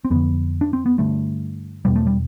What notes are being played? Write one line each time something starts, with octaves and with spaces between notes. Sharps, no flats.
C4
F2 D3 B3
D4
C4
B3
G2 D3 A3
E2 B2 G3
A3
G3